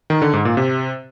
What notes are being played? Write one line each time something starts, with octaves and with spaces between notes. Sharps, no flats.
D#3
D3
G#2
A#2
C3